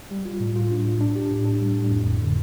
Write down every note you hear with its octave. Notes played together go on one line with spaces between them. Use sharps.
G3
F4
A2
F4
D4
A2
D4
G4
A2
D4
G3
A2
F2
G1
D3